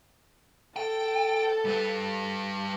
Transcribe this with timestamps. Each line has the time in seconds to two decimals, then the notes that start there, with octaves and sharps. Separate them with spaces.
0.76 A4 G5
1.65 G3 B4